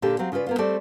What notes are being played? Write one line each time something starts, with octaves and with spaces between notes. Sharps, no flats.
A#2 D3 G4 A4
F#3 C4 F5
C#3 F4 G#4 B4 D5
A#3 B3 F4
G3 A3 C4 A4 D5